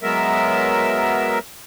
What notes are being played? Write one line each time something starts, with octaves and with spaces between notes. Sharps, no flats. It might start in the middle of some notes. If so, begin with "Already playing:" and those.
F#3 G#3 B3 A#4 E5